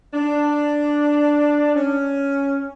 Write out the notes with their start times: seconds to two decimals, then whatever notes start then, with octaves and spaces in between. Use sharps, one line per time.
0.13 D4
1.75 C#4